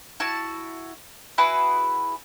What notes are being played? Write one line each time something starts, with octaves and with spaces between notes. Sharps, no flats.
E4 F#4 A5
E4 F#4 G#4 B4